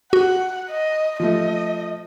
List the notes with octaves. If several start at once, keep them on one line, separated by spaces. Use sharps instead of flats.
F#4 F#5
D#5
F3 A3 D#5